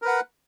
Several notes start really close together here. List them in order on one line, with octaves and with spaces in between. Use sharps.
A#4 B4 F#5